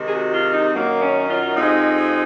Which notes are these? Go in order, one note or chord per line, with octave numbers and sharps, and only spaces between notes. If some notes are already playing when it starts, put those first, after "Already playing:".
Already playing: C3 D#3 G#3
G#4
F#4
F4
D#4
F#2 D#3 F#3 A#3
C#4
F4
F2 C3 F3 G#3 D#4